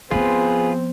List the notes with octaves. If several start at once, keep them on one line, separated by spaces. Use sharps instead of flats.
F3 B3 C4 F4 G#4 B4